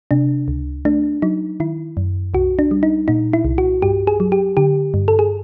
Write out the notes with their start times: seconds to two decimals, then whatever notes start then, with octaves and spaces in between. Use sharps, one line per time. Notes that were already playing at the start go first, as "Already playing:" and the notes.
0.11 C3 D4
0.48 C#2
0.85 A3 D4
1.22 F#3 D#4
1.60 D#3 E4
1.97 F#2
2.34 C2 F#4
2.59 D4
2.71 G3
2.83 D#4
3.08 A#2 D#4
3.33 E4
3.45 C2
3.58 F#4
3.82 G2 G4
4.07 G#4
4.20 F#3
4.32 G4
4.57 D3 G4
4.94 G2
5.08 A4
5.19 G#4